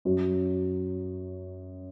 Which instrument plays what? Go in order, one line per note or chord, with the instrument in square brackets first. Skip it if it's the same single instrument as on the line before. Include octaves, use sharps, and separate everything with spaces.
[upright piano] F#2 F#3